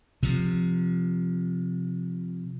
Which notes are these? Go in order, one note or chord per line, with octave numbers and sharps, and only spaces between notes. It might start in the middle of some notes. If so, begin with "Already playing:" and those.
C3 F3